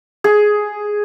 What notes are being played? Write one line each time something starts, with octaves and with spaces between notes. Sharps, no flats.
G#4